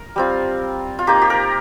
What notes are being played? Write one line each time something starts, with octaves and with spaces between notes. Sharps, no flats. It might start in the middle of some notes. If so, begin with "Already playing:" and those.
Already playing: A#4
G3 C4 F4
F4
A#3 D#4 G4
G4
A#4